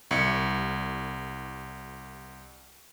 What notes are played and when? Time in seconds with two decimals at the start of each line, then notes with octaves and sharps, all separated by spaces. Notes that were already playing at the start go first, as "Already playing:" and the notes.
0.11 C2 C#7